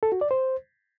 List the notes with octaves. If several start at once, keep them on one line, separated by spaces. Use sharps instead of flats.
A4
F#4
D5
C5